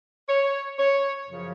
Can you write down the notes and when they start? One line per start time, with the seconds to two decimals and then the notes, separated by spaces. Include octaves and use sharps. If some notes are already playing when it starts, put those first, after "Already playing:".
0.29 C#5
0.79 C#5
1.29 F#2 C#3 F3